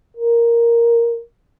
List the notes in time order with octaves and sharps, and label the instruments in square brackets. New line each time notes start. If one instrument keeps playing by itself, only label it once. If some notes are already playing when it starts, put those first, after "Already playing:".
[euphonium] A#4